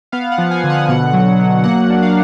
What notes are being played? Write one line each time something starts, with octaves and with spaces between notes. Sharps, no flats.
B3 F5
F#5
F3
G#5
D3
F#5
B2 F#5
F#3
F#3
A#3 F#5
D4
F5